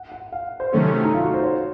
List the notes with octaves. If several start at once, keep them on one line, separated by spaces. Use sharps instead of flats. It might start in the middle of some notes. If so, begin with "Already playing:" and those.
Already playing: F#5
F#5
F5
C5
C3 D#3 F#3 A3 C#4 A4
D#4
F4
F#4
C5
C#5